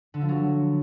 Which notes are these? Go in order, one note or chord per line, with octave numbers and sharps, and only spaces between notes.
D3
F3
F#3